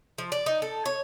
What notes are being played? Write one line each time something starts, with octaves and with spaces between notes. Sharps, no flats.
F3
D5
D#4
A4
C#5